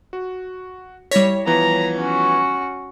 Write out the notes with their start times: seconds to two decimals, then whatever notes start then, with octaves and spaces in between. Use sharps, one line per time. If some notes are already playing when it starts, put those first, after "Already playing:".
0.13 F#4
1.11 G3 E4 C#5 A#6 B6
1.46 E3 F3 B3 A#5
1.96 C#4 F#4